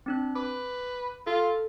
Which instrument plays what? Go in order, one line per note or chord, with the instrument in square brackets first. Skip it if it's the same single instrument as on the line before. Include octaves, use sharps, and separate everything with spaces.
[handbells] C4 D4 F#6
[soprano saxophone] B4 [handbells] D6
[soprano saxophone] F4 [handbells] A4